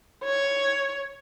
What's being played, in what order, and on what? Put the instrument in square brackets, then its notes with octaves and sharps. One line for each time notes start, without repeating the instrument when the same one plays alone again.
[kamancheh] C#5